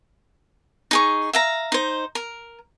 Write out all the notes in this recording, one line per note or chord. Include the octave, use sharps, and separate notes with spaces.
D#4 G#4 C#6
E5 F5 A#5
D#4 C5
A#4